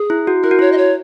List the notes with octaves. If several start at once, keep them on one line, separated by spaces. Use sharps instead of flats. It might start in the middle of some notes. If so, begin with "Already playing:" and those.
Already playing: G#4
E4
F#4
E4 A#4
F#4
E4 C#5
D#5
C#5